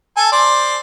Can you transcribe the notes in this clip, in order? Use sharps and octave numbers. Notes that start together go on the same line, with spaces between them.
A4 G#5
C5 D5